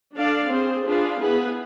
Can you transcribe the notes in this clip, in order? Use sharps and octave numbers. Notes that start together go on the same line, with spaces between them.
D4 A4 D5 F5
C4 G#4 C5
D4 F4 G#4 B4 F5
B3 E4 G#4 B4